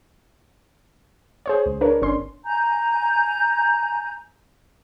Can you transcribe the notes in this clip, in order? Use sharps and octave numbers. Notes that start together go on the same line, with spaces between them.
G#4 C5 C#5
C#2
D4 A#4 B4 C#5
G1 C#4 D4 C6
G#5 A#5 G6